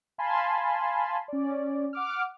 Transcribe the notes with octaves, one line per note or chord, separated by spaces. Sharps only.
F5 G#5 A5 B5 C6
C#4 D5
F#5 D6 F6